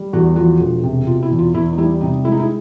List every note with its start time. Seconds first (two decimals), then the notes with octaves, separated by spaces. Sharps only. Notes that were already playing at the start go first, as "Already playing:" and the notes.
Already playing: G3
0.13 E2 F#4
0.36 F3 F#4
0.59 E1
0.83 C3
1.07 B2 F4
1.23 E4
1.31 E2
1.39 F4
1.54 E2 E4
1.73 D#4
1.78 G3 E4
2.01 C3 D#4
2.24 G#3 E4
2.32 D#4
2.39 E4